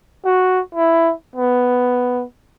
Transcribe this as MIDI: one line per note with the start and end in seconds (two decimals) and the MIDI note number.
0.25 0.61 66
0.75 1.13 64
1.36 2.24 59